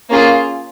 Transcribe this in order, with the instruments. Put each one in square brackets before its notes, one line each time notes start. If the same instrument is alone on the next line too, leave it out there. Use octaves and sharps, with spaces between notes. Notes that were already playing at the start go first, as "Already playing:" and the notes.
[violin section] A#3 C#4 F4 G#4